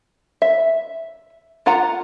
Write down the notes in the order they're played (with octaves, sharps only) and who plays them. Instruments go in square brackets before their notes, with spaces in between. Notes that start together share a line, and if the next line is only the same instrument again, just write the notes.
[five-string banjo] E5
D4 F4 F#5 A#5